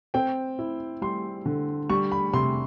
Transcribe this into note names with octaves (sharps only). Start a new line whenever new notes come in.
C4 G5
E4
G3 C6
D3
G3 C#6
B5
C3 C6